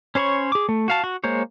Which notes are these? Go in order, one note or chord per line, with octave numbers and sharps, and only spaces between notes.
C#4 C5 C#5 B5 C#6
G#4 D6
A3
F#4 F5 A5
F#4
G#3 A#3 C5 C#5